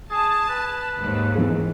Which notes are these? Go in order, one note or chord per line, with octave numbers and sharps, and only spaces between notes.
G#4 A5
B4
D#2 G#2
E3 G#4